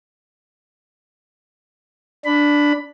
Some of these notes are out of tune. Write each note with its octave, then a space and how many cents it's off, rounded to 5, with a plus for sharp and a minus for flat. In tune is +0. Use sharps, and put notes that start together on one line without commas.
D4 +0 B5 +10